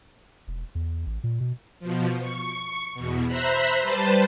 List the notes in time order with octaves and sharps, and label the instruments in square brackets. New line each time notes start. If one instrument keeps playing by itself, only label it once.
[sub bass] E1
E2
A1
A#2
B2
[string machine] B2 F3
C#6
E2 B2
C5 E5 A#5 B5 F#6 B6
G3 B4 C5 A5